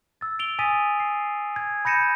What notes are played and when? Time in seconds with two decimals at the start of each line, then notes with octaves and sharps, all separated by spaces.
0.21 E6 A6
0.39 D7 F7 G7
0.59 G#5 D#6 A6 B6 D#7
1.00 C7
1.56 G#6
1.85 B5 G6 A#6 C#7 D#7 E7